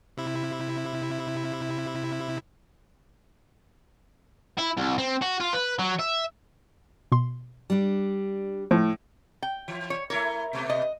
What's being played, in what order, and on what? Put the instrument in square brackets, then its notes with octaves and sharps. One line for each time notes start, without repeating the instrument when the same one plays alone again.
[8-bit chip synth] C3 E4
[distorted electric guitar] E4
C2
C4
F#4
F4
B4
F#3
E5
[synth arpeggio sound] B2 C6
[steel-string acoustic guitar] G3 D4
[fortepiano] A2 [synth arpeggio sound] F3
[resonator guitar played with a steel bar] G5
[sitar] E3
[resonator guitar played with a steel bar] C#5
[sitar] A3 E4 C#5 [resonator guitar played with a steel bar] A#4
[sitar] B2 A3 B3
[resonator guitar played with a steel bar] D#5